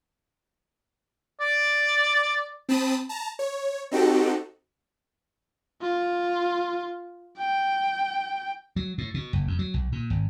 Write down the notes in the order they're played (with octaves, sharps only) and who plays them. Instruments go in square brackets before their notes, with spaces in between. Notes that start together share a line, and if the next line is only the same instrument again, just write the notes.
[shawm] D5
[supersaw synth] C4 A5 B5 D#6
A5 A#5
C#5
C4 D#4 F#4 G4 A4
[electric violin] F4
G5
[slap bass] F#3
A2
B2
F#1
F2
F#3
B1
A#2
G#1